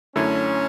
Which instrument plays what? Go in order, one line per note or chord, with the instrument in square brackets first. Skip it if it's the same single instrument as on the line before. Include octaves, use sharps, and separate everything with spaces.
[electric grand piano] F#2 D3 A3 E4 [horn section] C#4